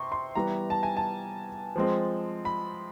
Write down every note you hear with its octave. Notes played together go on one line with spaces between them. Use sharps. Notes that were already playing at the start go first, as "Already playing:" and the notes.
Already playing: C3 C6 C#6
C6
E3 G3 B3 A#5
A5
G#5
A5
F3 G#3 C4
B5